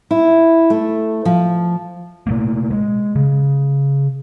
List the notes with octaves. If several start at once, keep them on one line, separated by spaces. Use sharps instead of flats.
E4
A3
F3
B2 A3 A#3
G#3
C#3